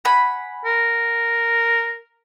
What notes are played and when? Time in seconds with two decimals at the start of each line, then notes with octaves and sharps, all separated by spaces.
0.05 F#5 G#5 B5
0.65 A#4